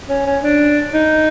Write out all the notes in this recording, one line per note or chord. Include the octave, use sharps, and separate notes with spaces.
C#4
C#4
D4
D#4